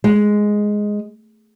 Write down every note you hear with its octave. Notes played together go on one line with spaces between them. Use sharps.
G#3